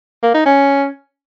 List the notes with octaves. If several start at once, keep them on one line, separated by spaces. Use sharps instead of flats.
A#3
D#4
C#4